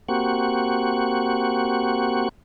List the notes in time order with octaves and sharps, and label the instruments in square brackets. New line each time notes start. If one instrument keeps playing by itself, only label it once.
[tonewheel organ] A#3 C4 F#4 G4 F#5 C#6